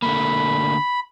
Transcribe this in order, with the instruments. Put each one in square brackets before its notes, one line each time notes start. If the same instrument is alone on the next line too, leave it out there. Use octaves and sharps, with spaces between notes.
[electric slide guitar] D3 A3 A#3 [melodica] B5